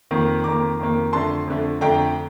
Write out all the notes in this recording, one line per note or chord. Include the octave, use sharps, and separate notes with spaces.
F2 D#3 A#3
F2 D#3 A#3 A#5 D6
F2 D#3 A#3
F2 D3 A3 A5 C6
F2 D3 A3
F2 D3 A3 G5 A#5